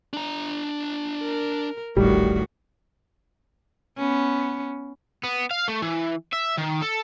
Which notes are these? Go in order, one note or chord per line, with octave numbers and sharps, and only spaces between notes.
D4 A#5
A#4
D#1 A1 A2 D#3 G3 F#4
B3 C#4
B3
F5
A3
E3
E5
D#3
A4